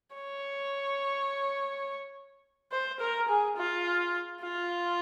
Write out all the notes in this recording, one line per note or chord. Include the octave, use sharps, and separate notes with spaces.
C#5
C5
A#4
G#4
F4
F4